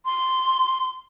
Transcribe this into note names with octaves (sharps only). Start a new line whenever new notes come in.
C6